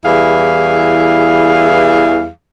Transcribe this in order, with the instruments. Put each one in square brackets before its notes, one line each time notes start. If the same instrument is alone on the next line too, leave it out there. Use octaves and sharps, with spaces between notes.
[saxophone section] E2 E3 G3 E4 G#4 F5